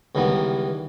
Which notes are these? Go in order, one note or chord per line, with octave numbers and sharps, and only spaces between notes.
C#2 D#3 E3 G3 B3